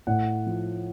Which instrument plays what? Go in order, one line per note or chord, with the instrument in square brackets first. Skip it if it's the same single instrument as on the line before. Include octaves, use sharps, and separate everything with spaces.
[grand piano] A2 F#5
F3